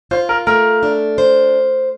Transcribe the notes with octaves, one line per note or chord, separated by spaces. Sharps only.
F4 C5
A#4
A3 A#4
D4
C5